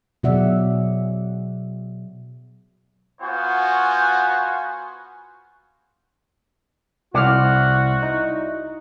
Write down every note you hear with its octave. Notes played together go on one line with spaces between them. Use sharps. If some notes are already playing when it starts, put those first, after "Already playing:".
B2 F#3 G#4 D5 E5 F#5
B3 F4 F#4 C5 G#5
C2 E4 F#4 C5 D5 F#5 F6
D#4